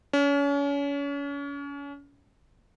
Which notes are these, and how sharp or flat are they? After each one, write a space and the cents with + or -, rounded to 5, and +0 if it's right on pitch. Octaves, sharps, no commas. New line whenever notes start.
C#4 +35